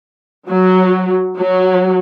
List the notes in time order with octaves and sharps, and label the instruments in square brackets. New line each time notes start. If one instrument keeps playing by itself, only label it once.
[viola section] F#3
F#3